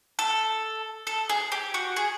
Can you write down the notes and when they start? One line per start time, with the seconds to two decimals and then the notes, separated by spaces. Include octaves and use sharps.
0.19 A4
1.07 A4
1.29 G#4
1.52 G4
1.74 F#4
1.96 G#4